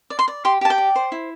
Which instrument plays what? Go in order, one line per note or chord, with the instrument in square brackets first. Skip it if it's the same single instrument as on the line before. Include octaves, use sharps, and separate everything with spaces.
[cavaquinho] D5
C6
D5
G4 C6
G4 A5
G5
D5
C5
E4